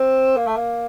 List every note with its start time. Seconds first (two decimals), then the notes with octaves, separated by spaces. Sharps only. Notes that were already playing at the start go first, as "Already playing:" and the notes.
Already playing: C4
0.37 A#3
0.47 A3
0.56 A#3